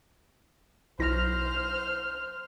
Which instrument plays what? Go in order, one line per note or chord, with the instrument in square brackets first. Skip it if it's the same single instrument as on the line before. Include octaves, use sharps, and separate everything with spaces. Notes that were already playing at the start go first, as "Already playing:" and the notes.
[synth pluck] B1 E4 A#6 [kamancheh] C5 F6